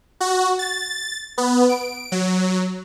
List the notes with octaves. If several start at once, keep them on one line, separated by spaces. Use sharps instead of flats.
F#4
A6
B3
D7
F#3